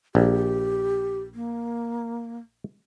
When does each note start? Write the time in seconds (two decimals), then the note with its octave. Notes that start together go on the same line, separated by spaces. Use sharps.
0.15 A#1 G4
1.35 A#3